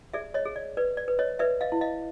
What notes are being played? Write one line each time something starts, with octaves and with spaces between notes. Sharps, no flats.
G#4 D5 E5
C#5 D#5
G#4
D5
B4 D5
D5
B4
C#5 D#5
B4 D5 E5
D#5 F5
E4
D#5 F5